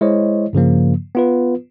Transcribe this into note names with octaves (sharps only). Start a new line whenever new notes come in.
G#3 E4 C5 C#5 D#5
G2 C#3 F3 A#3
B3 F4 B4